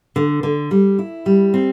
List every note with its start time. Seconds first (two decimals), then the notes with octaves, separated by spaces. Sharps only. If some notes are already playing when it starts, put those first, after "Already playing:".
0.16 D3
0.43 D3
0.71 G3
0.99 E4
1.26 G3
1.54 C4